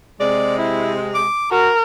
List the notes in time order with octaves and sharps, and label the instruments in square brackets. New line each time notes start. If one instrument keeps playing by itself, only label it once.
[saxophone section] C3 G#3 [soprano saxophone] D5
[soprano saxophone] E4
D6
[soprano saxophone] F#4 [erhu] A#4